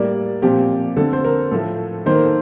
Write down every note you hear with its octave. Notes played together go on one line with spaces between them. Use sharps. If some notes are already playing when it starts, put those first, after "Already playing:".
Already playing: A2 G3 A#3 D5
A#2 F3 C4 G4
D3 A3 C4 A4
C5
A#4
A2 F3 A3 A4
D#3 A#3 C5
A#4
A4